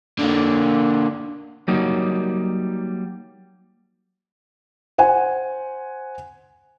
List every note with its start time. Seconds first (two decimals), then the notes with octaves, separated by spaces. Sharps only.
0.19 D3 A#3
1.68 F#3 G3 A#3 D#4
4.98 C5 F#5 G#5